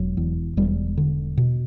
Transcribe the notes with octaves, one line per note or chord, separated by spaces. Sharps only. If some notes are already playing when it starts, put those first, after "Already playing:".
Already playing: E1 F#3
E2
E1 G3
D3
B2